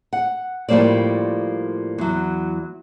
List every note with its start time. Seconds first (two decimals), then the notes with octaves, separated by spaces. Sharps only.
0.13 F#5
0.69 A2 F3 G3 A#3 C5 D5
1.98 E2 F#3